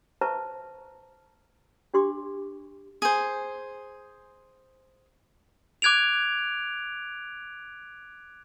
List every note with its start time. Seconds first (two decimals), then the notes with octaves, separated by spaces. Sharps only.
0.21 B4 C5 E5 A5 A#5 C#6
1.94 D4 G4 C6 D6
3.02 G#4 C5
5.82 D6 F#6 G#6 D7 F7